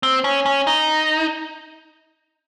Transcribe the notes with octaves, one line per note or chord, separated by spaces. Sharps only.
C4
C#4
C#4
D#4